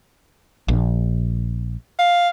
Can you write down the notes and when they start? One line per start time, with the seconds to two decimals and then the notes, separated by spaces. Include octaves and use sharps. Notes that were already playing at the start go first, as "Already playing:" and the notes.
0.68 A#1
1.99 F5